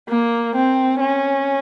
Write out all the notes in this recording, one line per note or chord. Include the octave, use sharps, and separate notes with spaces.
A#3
C4
C#4